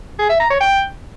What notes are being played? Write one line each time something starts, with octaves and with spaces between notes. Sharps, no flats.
G#4
E5
A#5
C#5
G5